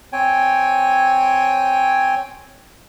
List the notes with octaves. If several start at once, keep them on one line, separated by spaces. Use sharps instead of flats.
C4 C#5 G5 G#5